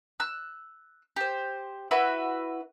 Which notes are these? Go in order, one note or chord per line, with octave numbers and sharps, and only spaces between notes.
E6 F#6
G4 C5
E4 F#4 B4 E5